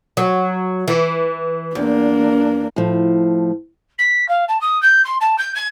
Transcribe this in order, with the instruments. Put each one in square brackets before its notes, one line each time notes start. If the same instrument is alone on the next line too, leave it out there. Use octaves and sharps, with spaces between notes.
[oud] F#3
E3
[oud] E2 [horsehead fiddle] A#3 D4
[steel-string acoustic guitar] A2 F3
[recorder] B6
F5
A5
D#6
G6
C6
A5
G6
G#6